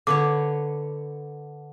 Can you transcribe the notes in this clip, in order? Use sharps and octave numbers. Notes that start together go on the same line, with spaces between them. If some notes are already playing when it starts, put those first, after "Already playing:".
D3 B4 C#5 D6